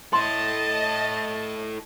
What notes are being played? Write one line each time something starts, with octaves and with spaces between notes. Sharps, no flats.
E4 A4 D#5 A5 C6 A6